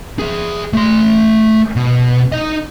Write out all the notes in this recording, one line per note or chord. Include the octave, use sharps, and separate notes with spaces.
G#4 E5
A3 C6
B2
D#4 D#5